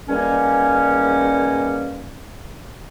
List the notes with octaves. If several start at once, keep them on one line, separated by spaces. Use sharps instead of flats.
E2 D#3 G3 A#3 C#4